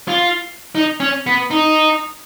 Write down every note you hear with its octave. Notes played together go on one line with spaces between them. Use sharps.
F4
D#4
C#4
B3
D#4